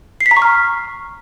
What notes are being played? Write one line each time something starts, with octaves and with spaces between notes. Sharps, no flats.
C7
B6
A#5
C#6
F6